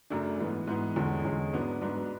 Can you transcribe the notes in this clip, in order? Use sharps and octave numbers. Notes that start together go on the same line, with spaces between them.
F#2 C#3 F#3 A3 D4
G#2 E3 B3
G#2 E3 B3
E2 D3 G#3 C#4
E2 D3 G#3 C#4
G#2 F#3 B3 D4
G#2 F#3 B3 D4